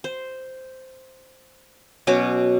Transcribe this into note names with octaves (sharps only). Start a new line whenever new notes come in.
C5
B2 F#3 C#4 D6